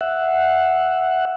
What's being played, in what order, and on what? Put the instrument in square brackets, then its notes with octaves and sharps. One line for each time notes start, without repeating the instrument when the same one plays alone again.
[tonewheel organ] E5 F#5